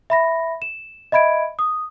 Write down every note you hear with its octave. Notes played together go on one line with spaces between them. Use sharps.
E5 B5 A#6
E7
D#5 E5 B5 G#6 D7
D#6